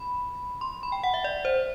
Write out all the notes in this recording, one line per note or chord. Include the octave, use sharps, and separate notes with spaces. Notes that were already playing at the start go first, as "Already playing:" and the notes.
Already playing: B5
C6
B5
G5
F#5
E5
D5
C5